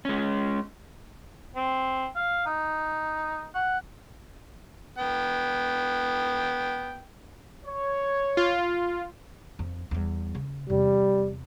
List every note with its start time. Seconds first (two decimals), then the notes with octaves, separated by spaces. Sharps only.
0.05 G#3 C#4
1.56 C4
2.16 F5
2.46 D#4
3.55 F#5
4.98 B3 G5
7.64 C#5
8.37 F4
9.59 F2
9.91 E2 G3
10.35 C#3
10.70 E2 C3 G3